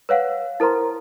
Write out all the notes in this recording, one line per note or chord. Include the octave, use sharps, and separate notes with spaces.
B4 C#5 F5 F#5
E4 A#4 C5 A#5 C6